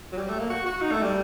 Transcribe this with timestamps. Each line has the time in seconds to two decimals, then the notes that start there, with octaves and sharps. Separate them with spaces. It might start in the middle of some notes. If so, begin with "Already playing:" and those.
0.12 F#3
0.18 G3
0.28 A3
0.39 A#3
0.50 F#4
0.66 F#4
0.82 D#4
0.91 A3
1.02 G3